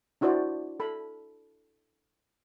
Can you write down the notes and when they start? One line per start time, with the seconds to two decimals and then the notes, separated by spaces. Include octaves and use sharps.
0.21 D4 E4 F#4 C5 D5
0.80 A4 B5